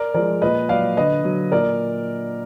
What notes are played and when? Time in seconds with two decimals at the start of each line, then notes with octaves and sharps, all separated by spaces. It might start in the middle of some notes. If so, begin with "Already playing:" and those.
Already playing: A#4 D5
0.14 F3 G#3 A#4 D5
0.42 A#2 B4 D#5
0.69 F#3 D5 F5
0.97 D3 B4 D#5
1.24 F#3
1.52 A#2 A#4 D5